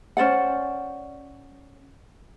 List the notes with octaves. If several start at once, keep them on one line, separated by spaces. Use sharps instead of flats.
C#4 C5 D5 F#5